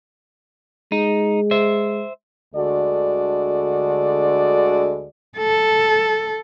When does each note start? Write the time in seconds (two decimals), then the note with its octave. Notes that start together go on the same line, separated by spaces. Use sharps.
0.92 G#3 D#4
1.51 C5 E5
2.55 D2 D3 G#3 F#4 D5
5.37 A4